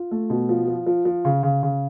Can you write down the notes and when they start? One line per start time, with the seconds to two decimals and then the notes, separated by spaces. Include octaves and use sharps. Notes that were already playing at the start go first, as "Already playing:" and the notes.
Already playing: F4
0.11 A3
0.30 B2
0.49 F3
0.67 F3
0.86 F3
1.05 F3
1.25 C#3
1.43 C#3
1.63 C#3